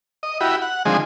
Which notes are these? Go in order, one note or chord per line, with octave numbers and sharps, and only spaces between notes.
D#5
E4 F#4 G4 B5
F#5
D3 F3 G#3 C4 D#4 G#4